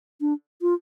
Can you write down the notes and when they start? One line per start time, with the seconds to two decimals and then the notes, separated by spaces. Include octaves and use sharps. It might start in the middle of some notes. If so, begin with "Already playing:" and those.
0.21 D4
0.62 F4